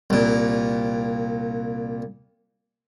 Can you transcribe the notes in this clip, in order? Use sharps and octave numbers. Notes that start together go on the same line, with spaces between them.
C2 A#2